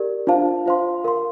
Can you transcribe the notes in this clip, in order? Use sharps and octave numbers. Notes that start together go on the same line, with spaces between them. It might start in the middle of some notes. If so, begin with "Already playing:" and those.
Already playing: G4 A#4 D5
D4 F4 C5 F5 A5
F4 C5 F5 C6
A#4 F5 C6